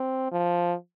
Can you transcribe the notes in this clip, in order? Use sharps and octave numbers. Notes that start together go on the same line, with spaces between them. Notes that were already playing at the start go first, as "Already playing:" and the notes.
Already playing: C4
F3